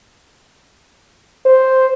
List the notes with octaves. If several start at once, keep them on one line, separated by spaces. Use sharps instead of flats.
C5